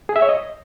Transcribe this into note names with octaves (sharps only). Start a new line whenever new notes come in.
G#4
E5
C#5
D#5